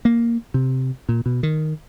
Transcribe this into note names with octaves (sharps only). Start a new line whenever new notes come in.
A#3
C3
A#2
B2
D#3